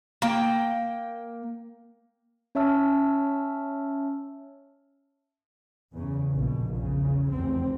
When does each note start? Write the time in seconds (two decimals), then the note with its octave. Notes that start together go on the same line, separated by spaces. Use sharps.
0.22 A#3 G5
2.55 C#4 C#5 E5 A5 E6 F6
5.93 E2 C#3
6.33 A#1 B2
6.76 E2 C#3
7.31 F1 E2 C4